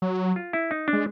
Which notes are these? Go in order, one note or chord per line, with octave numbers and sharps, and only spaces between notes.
F#3
F4
E4
D#4
D4
G#3